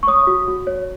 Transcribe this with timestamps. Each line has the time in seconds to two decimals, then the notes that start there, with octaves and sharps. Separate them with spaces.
0.03 C#6
0.07 C#5 D#6
0.27 F#4
0.48 F#4
0.67 C#5